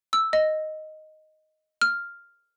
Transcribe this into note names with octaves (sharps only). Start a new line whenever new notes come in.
E6
D#5
F6